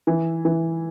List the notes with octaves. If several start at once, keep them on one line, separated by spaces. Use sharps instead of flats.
E3
E3